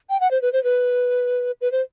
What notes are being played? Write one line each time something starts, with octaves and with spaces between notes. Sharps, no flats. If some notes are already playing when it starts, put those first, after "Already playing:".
G5
F#5
C5
B4
C5
B4
B4
C5